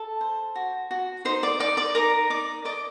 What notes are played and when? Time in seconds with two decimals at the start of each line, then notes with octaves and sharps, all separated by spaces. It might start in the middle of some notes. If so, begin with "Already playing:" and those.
Already playing: A4 A5
0.21 C5
0.56 F#4
0.91 F#4
1.25 D#4 C5 C6
1.43 D5 D6
1.60 D#4 D5 D6
1.77 D5 D6
1.95 D#4 A#4 A#5
2.30 D#4 D5 D6
2.65 D5 D#5 D6